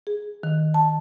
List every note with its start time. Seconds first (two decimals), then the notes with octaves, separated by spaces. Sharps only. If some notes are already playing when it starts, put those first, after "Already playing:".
0.07 G#4
0.43 D#3
0.74 A5